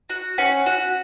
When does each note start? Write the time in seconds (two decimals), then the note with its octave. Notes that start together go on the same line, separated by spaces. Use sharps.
0.10 F#4
0.38 C#4 F#5
0.66 F#4